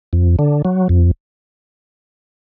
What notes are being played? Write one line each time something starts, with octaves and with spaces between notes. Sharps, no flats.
F2
D3
F#3
F2